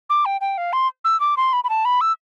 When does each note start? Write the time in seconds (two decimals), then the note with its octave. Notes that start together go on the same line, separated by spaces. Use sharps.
0.10 D6
0.25 G5
0.41 G5
0.58 F5
0.73 C6
1.04 E6
1.20 D6
1.37 C6
1.53 B5
1.64 B5
1.69 A5
1.85 B5
2.01 E6